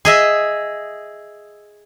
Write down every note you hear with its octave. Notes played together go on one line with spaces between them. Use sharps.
G#4 D#5 E5